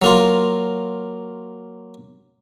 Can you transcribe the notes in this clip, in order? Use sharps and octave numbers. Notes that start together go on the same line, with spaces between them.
F#3 A#3 F4